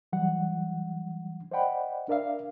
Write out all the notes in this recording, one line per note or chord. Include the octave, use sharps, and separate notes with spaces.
E3 F#3 G3 F#5
C5 D5 D#5 F#5 G5 B5
D4 A#4 D5 E5 F5